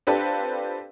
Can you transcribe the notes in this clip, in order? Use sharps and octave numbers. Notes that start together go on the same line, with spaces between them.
C4 D4 F4 G4 A4 B4